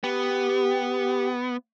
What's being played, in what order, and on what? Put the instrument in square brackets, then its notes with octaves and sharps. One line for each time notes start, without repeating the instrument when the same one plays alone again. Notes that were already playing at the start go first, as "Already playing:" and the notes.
[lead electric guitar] B3 [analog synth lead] G4